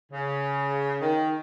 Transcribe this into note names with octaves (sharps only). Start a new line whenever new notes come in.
C#3
D#3